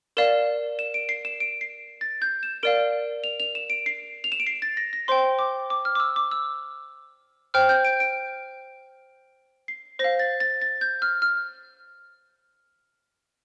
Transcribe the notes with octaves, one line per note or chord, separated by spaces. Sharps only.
A#4 D5 F5 E7
E7
D7
C7
E7
D7
C7
A6
G6
E7
A#4 D5 F5 D7
F7
F7
E7
D7
C7
F7
E7
D7
C7
A6
A#6
A#6
C5 G5 C6
D6
D6
F6
D6
E6
D6
E6
C5 G5 F6
G6
D7
D7
C7
C5 A#6
F5
A6
A6
A6
G6
F6
F6